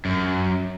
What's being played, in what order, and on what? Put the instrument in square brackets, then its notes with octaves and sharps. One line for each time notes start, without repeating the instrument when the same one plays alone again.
[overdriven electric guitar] F#2